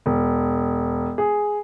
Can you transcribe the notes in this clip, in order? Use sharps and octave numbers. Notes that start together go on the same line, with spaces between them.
E1
G#4